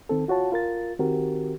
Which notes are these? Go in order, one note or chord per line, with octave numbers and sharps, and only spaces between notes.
D#3 C4 A4
F4 F#4 C#5 A5
F4 A#4 A6
D#3 C4 F#4 G4 A#4